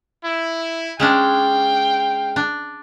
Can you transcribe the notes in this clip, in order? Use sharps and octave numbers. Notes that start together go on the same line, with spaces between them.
E4
G#3 C#4 D4 F5 G5
D4